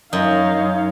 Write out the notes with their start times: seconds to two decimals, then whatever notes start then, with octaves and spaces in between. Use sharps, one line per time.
0.13 F#2 D#4 C#5 D#5 F5